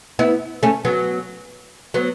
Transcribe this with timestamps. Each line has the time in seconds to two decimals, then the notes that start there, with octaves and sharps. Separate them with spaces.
0.19 B3 E4
0.63 A3 C#4
0.85 F#3 B3
1.94 F#3 B3